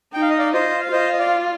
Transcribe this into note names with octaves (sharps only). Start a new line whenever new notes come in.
D#4 G5
F5
D#5
D5 F5
F4 C5 D#5
F5
F4 C5 D#5
D#5
D5 F5